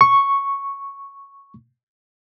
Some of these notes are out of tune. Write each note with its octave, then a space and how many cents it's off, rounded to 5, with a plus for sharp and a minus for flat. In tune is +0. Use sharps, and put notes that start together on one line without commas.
C#6 +0